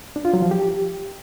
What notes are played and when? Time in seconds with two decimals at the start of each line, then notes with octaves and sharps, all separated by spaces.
0.16 D4
0.25 F4
0.34 F#3
0.42 F3
0.51 G4